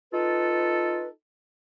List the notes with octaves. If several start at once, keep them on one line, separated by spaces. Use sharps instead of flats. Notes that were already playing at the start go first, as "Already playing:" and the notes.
D#4 F4 A4 B4